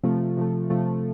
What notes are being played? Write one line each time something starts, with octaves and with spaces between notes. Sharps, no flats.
C3 F3 A3
C3 F3 A3
C3 F3 A3